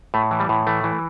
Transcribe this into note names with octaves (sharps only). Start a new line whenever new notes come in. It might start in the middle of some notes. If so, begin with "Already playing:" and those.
A2 A3
E3
G3
A2
E3 A3
E3